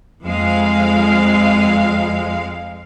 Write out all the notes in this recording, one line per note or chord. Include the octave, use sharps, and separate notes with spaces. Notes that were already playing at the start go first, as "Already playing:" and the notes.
F2 G#3 F5